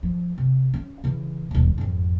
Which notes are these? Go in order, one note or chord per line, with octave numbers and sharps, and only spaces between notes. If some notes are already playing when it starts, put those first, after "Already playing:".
F3
C3
C#4
C#3 E3
D#1 B1
G#1 F2